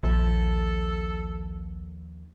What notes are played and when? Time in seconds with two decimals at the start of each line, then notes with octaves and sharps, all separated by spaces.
0.03 A#1 D#2 F3 A4